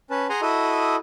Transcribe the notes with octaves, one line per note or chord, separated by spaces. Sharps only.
C#4 B4 A5
G#4 F#5 G#5 A#5 C6
E4 F#4 A4 D#5 D#6